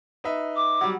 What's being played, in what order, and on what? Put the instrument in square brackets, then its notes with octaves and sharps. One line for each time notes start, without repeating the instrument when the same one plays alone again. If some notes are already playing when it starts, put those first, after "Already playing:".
[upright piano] D#4 B4 E5
[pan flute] D6
[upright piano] F#3 G3